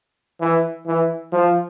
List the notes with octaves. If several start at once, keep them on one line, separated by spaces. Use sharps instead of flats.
E3
E3
F3